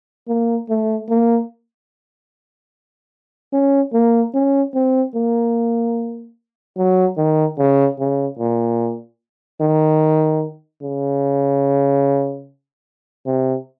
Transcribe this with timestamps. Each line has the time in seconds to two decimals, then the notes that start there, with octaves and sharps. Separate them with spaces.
0.28 A#3
0.70 A3
1.10 A#3
3.53 C#4
3.94 A#3
4.34 C#4
4.75 C4
5.15 A#3
6.78 F#3
7.17 D#3
7.59 C#3
7.99 C#3
8.39 A#2
9.61 D#3
10.82 C#3
13.26 C3